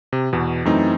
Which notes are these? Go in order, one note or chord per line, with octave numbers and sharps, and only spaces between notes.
C3
E2 B2
F#2 E3 A3 C4 D#4